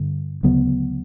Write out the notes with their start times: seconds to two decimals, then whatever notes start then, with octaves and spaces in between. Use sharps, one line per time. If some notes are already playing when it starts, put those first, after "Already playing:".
Already playing: G2 D3
0.43 D2 C#3 F#3 B3